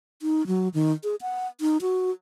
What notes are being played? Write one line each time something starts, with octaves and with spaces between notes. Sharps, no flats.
D#4
F#3
D#3
G#4
F#5
D#4
F#4